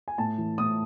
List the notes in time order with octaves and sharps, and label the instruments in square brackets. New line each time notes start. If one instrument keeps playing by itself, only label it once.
[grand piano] G#5
A2 A5
E3
A2 D#6